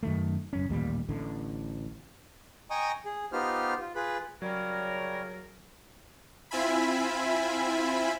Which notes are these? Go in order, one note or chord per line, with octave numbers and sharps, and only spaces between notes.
F#2 D#3 A3
F#1 F#2 C#4
A1 D#2 A#2 G3
A1 A2 D3
D#5 G5 G#5 A#5 C#6 D#6
G#4
B3 D#4 F4 G4 C5 F6
F4
F4 G#4 B4 B5
C#3 F#3 G3 A#4 C#5
C4 E4 F4 E5 G#5 B5